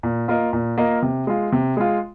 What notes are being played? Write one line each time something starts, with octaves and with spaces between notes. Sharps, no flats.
A#2
A#3 F4 A#4 D#5
A#2
A#3 F4 A#4 D#5
C3
G#3 F4
C3
G#3 F4